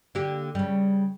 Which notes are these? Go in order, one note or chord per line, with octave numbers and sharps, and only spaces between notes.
D3 A#3 G4
C#3 G3